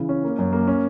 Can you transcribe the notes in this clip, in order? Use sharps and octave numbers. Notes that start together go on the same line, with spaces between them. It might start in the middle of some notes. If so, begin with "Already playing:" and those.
Already playing: C#3 E3
C#4
A#3
F#2
A#3
C#4